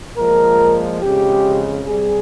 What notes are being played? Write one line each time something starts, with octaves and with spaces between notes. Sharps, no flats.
A#2 F3 G#3 A#4
F2 C#3 G#3 G4
C3 G3 G#4